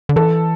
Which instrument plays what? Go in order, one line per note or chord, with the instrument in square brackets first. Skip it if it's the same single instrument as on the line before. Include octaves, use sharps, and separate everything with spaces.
[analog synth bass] D3
[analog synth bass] E3 [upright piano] A4